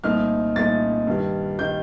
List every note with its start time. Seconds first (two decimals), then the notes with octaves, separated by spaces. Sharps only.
0.04 C2 A#2 A3 D#4 F6
0.56 C2 A#2 A3 D#4 A6
1.07 G2 D#3 G3
1.58 D#3 G3 G6